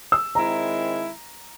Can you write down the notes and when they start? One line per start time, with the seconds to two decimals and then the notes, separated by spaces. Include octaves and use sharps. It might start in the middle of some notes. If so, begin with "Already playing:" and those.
0.12 E6
0.35 D#3 G#3 C4 E4 A#5